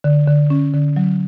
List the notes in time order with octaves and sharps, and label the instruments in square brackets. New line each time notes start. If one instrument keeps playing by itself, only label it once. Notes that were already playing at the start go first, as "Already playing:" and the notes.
[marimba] D3
D3
C#4
D3
F#3